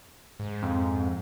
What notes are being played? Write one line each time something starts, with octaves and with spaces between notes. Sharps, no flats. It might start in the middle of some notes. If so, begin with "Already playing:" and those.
G#2
F2